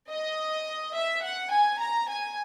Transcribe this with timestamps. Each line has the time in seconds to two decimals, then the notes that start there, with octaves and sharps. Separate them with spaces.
0.10 D#5
0.95 E5
1.23 F#5
1.52 G#5
1.80 A#5
2.08 G#5